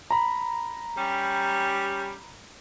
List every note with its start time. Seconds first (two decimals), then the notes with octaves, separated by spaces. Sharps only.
0.11 A#5 B5
0.97 G3 C#4 G4